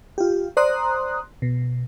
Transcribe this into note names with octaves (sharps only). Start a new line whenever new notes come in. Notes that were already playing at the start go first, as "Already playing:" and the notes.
F4 G4
C5 D5 A#5 C6 D#6 F#6
B2